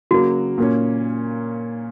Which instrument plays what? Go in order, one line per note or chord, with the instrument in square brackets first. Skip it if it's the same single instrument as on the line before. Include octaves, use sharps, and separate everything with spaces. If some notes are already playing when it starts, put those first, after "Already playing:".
[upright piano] C#3 F#3 A#3 [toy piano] F#4
[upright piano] A#2 A#3 C#4